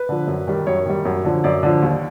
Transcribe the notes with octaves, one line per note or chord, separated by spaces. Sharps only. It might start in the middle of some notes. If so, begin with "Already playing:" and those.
Already playing: B4
D3 F3
F#2
D#3 G3
F#2 C#5
D#3 G3
F#2
D3 F3
F#2 D5
D3 F3
D#2